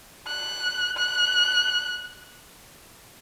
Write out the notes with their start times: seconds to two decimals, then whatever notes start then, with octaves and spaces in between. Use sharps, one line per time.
0.27 F#6
0.97 F#6